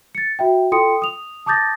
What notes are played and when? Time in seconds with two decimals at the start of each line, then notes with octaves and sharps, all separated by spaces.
0.15 A6 C#7
0.39 F#4 E5 G5
0.72 F4 A4 G5 C6 D#6 C#7
1.02 D#6 F7
1.46 A5 D6 D#6 G6 A6 A#6